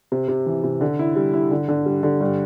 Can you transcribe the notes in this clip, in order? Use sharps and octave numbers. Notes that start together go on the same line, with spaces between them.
C3
C3
E3
C3
D3
E4
G3
E4
D3
D3
G3
D3
G2